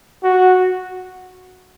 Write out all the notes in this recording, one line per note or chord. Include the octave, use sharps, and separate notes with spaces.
F#4